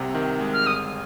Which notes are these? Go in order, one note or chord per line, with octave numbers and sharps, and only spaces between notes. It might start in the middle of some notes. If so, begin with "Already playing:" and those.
Already playing: C2 C3
D#3
G#3
F6
G1 D#6